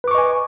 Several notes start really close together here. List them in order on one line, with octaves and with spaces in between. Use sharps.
B4 D6 C#6 D#5 G#5